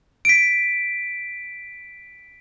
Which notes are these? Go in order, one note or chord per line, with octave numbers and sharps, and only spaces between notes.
B6 D7